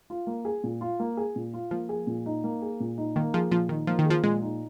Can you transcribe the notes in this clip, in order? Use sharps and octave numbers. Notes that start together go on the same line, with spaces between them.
F4
A#3
G#4
A#2
F4
A#3
G#4
A#2
F4
F3 A#3
G#4
A#2
D#4
A#3
G#4
A#2
D#4
D#3 A#3
F3 G#4
A#2 F3
D#3 D#4
F3 A#3
D#3
G#4
F3
A#2 G#3
D#4